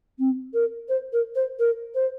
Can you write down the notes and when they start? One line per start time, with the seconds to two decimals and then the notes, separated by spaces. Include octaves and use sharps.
0.18 C4
0.53 A#4
0.88 C5
1.12 A#4
1.35 C5
1.59 A#4
1.94 C5